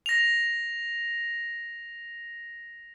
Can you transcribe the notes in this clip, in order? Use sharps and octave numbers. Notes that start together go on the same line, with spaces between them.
A#6 F7